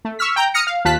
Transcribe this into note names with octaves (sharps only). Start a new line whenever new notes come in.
A3
C#6 E6 F6 B6
G5 A#5 G6
D#6 F6 A#6 C#7
F5
D#2 F4 A5 F#6 B6